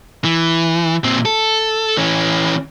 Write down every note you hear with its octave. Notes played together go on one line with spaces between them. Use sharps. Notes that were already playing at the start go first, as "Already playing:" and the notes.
E3
A#2 C4
A4
E3 C#4